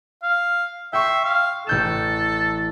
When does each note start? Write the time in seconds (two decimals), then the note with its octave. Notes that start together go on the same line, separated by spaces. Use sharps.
0.23 F5
0.93 E5 G5 C6 C#6
1.24 F5
1.67 A1 A4 G6 E7